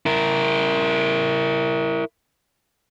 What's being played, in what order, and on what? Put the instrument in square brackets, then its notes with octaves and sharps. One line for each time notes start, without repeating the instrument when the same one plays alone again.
[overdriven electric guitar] E4 A#4